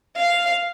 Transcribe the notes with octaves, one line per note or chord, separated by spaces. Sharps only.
F5